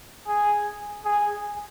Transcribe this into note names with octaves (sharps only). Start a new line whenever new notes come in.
G#4
G#4